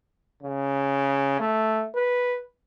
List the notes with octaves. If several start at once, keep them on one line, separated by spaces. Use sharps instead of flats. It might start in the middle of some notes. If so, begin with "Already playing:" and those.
C#3
A3
B4